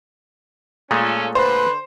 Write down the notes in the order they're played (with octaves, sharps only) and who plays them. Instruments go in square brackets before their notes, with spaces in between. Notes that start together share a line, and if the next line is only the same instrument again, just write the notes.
[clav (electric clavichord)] A#2 G#3 A3 [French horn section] C#4 F4 A4
[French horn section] D3 [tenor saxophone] B4 [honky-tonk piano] C5